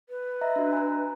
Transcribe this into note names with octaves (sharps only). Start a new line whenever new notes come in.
B4
D#5 E5 A#5
D4 F#4
G#5 A#5